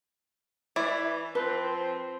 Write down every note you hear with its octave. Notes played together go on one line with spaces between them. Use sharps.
E3 E4 D5
F3 C4 B4